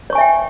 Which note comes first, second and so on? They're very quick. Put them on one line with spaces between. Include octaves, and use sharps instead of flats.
C#5 C#6 G#5 E5 G5